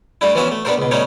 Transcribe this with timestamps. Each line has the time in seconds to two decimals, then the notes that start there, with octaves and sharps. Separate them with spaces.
0.21 G3 A3 D4 E4
0.35 E3 F3 B3 C#4 F#4 E5
0.52 A3
0.65 B3 D4 G4 A4 A#4 C5
0.78 C#2 B2
0.91 G3 A3 B3 C#4 D#4 C#5